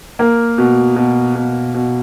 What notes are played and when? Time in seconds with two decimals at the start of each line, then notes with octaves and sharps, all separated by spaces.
0.19 A#3
0.58 B2
0.96 B2
1.35 B2
1.74 B2